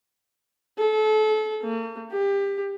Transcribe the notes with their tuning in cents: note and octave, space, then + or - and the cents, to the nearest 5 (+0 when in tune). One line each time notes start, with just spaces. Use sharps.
A4 -30
A#3 -45
G4 +25